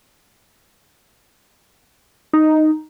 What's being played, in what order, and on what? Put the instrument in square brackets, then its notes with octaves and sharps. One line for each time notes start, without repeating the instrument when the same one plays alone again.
[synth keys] D#4